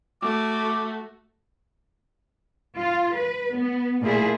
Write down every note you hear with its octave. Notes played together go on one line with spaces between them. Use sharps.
A3 F#4 D6
F4
B4
B3
A#2 A3 E4 G#4